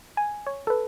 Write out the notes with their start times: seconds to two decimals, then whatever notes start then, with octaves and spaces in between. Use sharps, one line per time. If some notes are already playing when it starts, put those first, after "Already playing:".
0.17 G#5
0.47 C#5
0.67 A4 B4